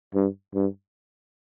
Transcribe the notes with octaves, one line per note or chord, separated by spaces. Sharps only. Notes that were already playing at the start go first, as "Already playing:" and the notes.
G2
G2